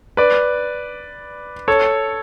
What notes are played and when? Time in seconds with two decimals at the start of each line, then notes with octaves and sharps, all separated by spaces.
0.17 B4 D5
1.68 A4 C#5